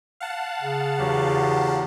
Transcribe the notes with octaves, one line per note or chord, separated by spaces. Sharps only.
F5 F#5 A5
C#3
E2 F#3 G4